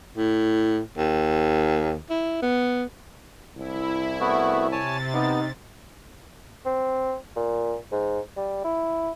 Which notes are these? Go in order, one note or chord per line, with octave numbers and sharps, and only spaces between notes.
A2
D#2
E4
B3
C2 E4
A3 B3 F#4
C3 C#5 G#5 A5 A6
B3 D#4
C4
A#2
G#2
G3
E4